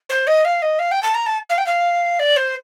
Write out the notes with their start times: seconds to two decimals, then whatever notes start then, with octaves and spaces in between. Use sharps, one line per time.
0.09 C5
0.27 D#5
0.44 F5
0.62 D#5
0.79 F5
0.91 G5
1.02 A5
1.14 A#5
1.26 A5
1.49 F5
1.58 G5
1.66 F5
2.19 D5
2.36 C5